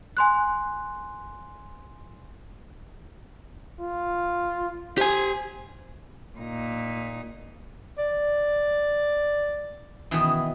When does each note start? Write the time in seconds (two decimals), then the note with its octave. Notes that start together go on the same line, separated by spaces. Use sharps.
0.17 G#5 C6 F#6
3.81 F4
4.98 G4 C5 G#5
6.38 A#2 D#4
7.98 D5
10.11 B2 D#3 E3